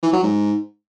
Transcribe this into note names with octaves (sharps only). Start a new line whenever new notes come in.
E3
F#3
G#2